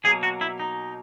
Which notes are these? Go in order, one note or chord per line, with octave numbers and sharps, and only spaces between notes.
B2 F#3 A#3 G#4
F#4
E4
D#4